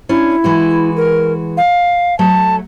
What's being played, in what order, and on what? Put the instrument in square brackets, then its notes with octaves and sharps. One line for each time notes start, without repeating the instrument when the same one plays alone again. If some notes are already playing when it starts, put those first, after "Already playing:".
[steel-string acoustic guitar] C#4 D4 [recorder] E4
[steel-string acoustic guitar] E3 G#3 F#4
[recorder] A#4
F5
[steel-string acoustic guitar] F#3 A3 [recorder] A5